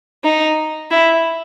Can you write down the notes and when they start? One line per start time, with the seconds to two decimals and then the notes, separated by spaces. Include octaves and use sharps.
0.24 D#4
0.90 E4